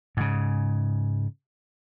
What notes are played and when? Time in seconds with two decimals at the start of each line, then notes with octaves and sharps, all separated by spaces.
0.17 G#2 C#3